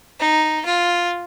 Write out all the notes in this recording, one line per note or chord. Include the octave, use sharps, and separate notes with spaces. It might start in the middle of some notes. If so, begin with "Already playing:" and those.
D#4
F4